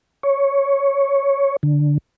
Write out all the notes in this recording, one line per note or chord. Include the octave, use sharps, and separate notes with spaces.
C#5
D3